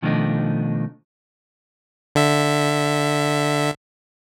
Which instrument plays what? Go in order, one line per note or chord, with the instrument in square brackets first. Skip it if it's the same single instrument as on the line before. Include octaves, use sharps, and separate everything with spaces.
[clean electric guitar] B2 D#3 F3 A3 D4 D#4
[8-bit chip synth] D3 E5